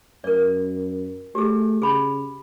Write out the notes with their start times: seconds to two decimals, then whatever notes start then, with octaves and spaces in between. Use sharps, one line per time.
0.24 F#2 A#4 D5
1.35 A3 G4 G#4
1.82 C#3 G#4 B5